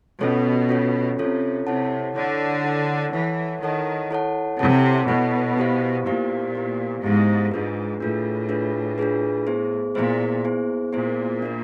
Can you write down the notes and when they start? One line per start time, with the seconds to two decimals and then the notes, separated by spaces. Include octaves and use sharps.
0.20 B2 C#4 F4 A4 C#5
0.69 C#4 F4 A4 C#5
1.18 C3 C#4 F4 A4 C#5
1.67 C3 E4 A4 C#5 F#5 A5
2.15 D3 E4 A4 C#5 F#5 A5
2.64 E4 A4 C#5 F#5 A5
3.13 E3 E4 A4 C#5 F#5 A5
3.62 D#3 E4 A4 C#5 F#5 A5
4.11 E4 A4 C#5 F#5 A5
4.59 C3 E4 A4 C#5 F#5 A5
5.08 B2 E4 A4 C#5 F#5 A5
5.57 B3 E4 G4 C5 F5
6.06 A#2 B3 E4 G4 C5 F5
6.55 B3 E4 G4 C5 F5
7.03 G#2 B3 E4 G4 C5 F5
7.51 G#2 D4 F4 G#4 B4
8.00 A2 D4 F4 G#4 B4
8.49 D4 F4 G#4 B4
8.98 D4 F4 G#4 B4
9.47 B3 E4 G#4 C5
9.95 A#2 B3 E4 G#4 C5
10.44 B3 E4 G#4 C5
10.93 A#2 B3 E4 G#4 C5
11.42 A#3 D4 F4 A#4